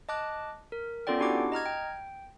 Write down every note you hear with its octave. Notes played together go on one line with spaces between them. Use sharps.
D#5 A5 D6 F#6
A#4
B3 C#4 F4 A4 D5 G5
D4 E4 F#4 G4 F#5 D6
D#5 A#5 F6 G#6
G5